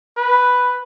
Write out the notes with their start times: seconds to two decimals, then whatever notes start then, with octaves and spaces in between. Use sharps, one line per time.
0.17 B4